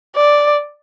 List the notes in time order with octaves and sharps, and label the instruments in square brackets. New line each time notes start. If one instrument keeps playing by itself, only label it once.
[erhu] D5